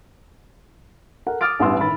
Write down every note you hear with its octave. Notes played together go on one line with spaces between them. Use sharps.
A4 A#4 F#5
D6 D#6 F6 A6 D7
A1 E2 G2 F#5 C6 E6
A2 D#3 B5 A6